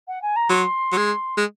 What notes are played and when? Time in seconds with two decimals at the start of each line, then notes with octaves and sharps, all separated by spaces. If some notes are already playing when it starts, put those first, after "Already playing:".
0.07 F#5
0.22 G#5
0.36 A#5
0.49 F#3 C6
0.92 F#3
0.97 G#3
1.38 G#3